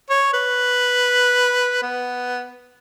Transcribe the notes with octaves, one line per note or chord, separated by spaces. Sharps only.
C#5
B4
B3